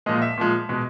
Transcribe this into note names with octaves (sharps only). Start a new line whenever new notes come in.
A#2 F3 G#3 D#5
E5
A#2 F3 G#3
B2 G#3